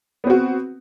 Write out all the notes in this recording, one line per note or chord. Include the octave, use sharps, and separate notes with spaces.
B3 C4 F#4